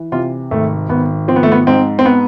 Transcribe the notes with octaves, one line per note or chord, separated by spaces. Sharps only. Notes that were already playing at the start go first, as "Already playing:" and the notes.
Already playing: E3
C3 F4
G#1 A3
G#1 B3
F3 C4
B3
A3
B3
G#2 C4
C4
B3